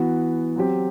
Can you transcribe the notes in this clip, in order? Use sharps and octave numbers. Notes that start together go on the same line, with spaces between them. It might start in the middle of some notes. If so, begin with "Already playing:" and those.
Already playing: E3 B3 F#4
F#3 C4 G4